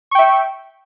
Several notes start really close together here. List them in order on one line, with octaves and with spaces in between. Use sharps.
C#6 G5 E5